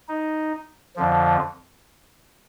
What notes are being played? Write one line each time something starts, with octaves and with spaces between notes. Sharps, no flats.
D#4
F2 D3 F3